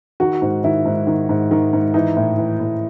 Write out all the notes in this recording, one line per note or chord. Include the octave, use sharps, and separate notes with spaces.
D#3 F#4
G#2
D#3 E4
G#2
D#3
G#2
D#3
G#2
E3 D#4
A2
E3
A2